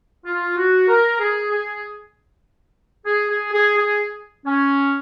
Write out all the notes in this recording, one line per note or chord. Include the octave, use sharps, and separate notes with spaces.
F4
F#4
A#4
G#4
G#4
G#4
G#4
G#4
G#4
C#4